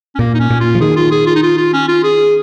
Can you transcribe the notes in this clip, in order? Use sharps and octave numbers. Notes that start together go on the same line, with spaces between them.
C#4
A#2 A#3
D#4
C#4
A#2
F4
F3
D#3 G#4
F4
G#4
F4
D#4
F4
F4
C#4
F4
G#4